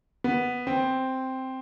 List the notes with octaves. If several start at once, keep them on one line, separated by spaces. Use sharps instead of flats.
B3
C4